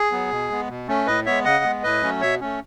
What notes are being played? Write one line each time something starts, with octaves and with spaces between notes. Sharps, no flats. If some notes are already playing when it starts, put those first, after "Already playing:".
Already playing: G#4
F#3 B3
B2
G#3 B3
B2
A3 C#4
A2 B4 D#5
G#3 B3 C#5 E5
C#3 D#5 F#5
G#3 B3
A2 B4 D#5
F#3 A3 C#4
B2 C#5 E5
A3 C#4